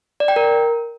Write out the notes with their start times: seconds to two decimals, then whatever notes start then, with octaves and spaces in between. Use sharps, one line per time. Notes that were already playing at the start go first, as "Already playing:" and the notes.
0.20 D5
0.28 G5
0.36 A#4